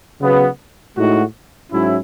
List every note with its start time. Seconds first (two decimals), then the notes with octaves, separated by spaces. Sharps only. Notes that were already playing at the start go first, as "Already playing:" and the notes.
0.21 C#3 F#3 B3
0.96 A2 G#3 D#4 F#4
1.71 G#2 F#3 C#4 E4